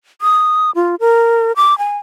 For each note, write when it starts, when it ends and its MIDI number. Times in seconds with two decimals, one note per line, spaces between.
0.22 0.71 87
0.75 0.95 65
1.00 1.52 70
1.56 1.77 86
1.78 1.98 80